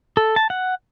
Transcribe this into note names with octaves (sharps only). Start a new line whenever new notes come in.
A4
A5
F#5